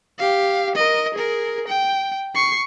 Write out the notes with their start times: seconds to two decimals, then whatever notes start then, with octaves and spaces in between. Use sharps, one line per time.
0.18 G4 F5
0.75 A#4 D#5
1.14 G#4 A#4
1.68 G5
2.35 C#6 C7